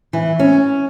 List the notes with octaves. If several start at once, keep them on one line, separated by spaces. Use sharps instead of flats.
E3
C#4